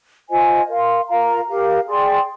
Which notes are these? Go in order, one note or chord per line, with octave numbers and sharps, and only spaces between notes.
F4 C5 D#5 G#5
A#4 F5 C6
F4 A#4 F5 A#5
G4 A#4 F5
G#4 D5 G5 C6